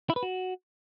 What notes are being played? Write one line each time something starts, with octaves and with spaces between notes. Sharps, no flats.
E4
B4
F#4